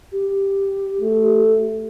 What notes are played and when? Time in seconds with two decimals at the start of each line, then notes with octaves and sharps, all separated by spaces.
0.12 G4
1.01 A3